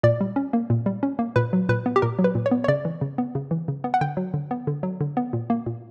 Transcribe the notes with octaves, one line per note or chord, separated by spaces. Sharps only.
A#2 D5
G3
C#4
A#3
A#2
G3
C#4
A#3
A#2 B4
F#3
A#2 B4
B3
G4
A#2 A#4
F#3
B4
A#2
C#5
B3
C#5
C#3 D5
E3
C#3
B3
C#3
E3
C#3
B3
F#5
D3 G5
F#3
D3
B3
D3
F#3
D3
B3
A#2
A#3
A#2